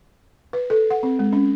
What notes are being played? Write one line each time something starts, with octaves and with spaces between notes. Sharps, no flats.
B4
A4
F#5
C4
G#3
C#4